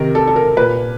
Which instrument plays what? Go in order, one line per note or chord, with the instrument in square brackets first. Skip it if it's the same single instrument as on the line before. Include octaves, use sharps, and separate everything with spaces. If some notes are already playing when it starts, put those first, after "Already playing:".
Already playing: [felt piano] C3 D#3 A#4
A4
A4
A#4
A#2 B4